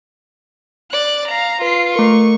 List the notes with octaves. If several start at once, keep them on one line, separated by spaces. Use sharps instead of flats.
D5 F#6
F5 A#5
F4 B4 C7
A3 A#4 C#6